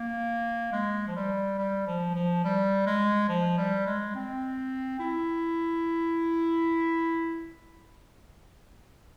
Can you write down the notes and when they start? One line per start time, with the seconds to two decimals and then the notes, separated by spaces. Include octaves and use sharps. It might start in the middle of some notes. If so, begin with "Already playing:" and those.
Already playing: A#3
0.72 G#3
1.08 F3
1.16 G3
1.58 G3
1.87 F3
2.15 F3
2.44 G3
2.86 G#3
3.29 F3
3.58 G3
3.86 G#3
4.15 C4
4.99 E4